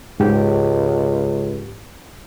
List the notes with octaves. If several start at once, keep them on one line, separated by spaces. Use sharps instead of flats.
C#2 G#2 G4